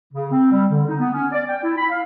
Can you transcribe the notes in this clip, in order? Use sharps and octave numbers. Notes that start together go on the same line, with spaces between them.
C#3
C4
G3
D3
D#4
B3
C#4
D5
G5
E4
B5
F5